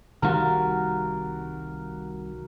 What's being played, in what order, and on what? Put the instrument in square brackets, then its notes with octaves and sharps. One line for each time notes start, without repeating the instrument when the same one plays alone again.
[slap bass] C2 D#3 G3 [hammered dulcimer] F#4 A#4